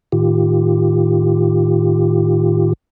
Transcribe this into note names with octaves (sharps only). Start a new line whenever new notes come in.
A2 D#3 F4 G4